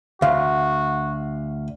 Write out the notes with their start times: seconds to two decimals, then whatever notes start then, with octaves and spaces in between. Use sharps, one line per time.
0.22 D2 F#4 F5